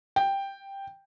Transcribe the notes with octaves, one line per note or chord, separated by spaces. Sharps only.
G5